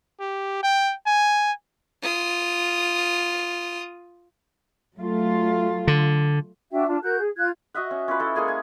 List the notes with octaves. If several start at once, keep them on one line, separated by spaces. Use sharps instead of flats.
G4
G5
G#5
F4 D#6
F#3 A3 F4
D3
D4 F#4 E5 G5
D4 F4 A5
F#4 A#4 F#6 G6
G#4
F4 F#6 G#6
F#4 D#5 E5 F#5
C#4
C#4 F4 B4
E4 A4
G#3 A#3 G#4 G#5
G#5